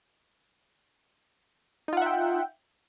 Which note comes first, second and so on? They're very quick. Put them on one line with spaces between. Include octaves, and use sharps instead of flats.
D#4 F4 F#5 E5 G5